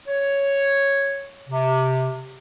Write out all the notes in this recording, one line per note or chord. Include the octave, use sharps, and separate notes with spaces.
C#5
C3